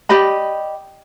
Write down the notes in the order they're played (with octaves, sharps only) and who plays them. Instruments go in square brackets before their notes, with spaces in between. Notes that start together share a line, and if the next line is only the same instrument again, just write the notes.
[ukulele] G4 D5 D#5 B5